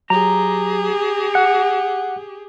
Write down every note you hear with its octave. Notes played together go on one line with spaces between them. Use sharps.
F#3 G4 G#4 A#5
F#5 C#7